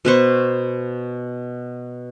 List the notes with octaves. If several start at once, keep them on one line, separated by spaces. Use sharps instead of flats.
B2 B4 C5 C#6